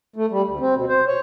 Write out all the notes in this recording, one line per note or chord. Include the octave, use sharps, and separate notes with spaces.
A3
G3
D2
C4
B2
C5
C#5